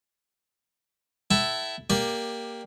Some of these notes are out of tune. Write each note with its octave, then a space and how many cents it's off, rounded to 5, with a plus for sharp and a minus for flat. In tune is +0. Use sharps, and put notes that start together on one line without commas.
E4 +0 A4 +0 F#5 +45
A#3 +0 G4 +5 D5 +15